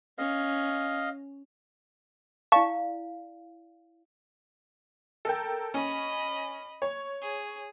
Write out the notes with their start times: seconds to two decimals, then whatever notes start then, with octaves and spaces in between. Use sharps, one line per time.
0.18 C#4 D#5 F5
2.52 E4 D5 F5 A5 C#6
5.25 A4 A#4 G5
5.74 C#4 D#5 B5
6.82 C#5
7.22 G#4